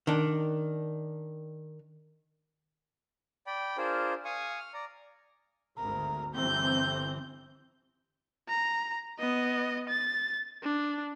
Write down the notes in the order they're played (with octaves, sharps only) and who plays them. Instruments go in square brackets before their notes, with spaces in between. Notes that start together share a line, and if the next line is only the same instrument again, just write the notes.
[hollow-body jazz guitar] D#3 D4
[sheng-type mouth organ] D5 G5 B5
D4 F4 G#4 A#4 C5
F5 G#5 C#6 D#6
F6
D5 A#5
[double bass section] G#1 D2 [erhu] A#4
[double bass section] G1 E3 C4 [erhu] G6
[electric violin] A#5
B3 D#5
A6
D4